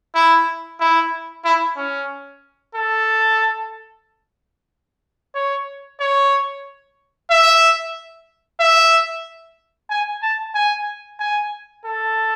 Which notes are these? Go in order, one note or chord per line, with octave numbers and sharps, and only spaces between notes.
E4
E4
E4
C#4
A4
C#5
C#5
E5
E5
G#5
A5
G#5
G#5
A4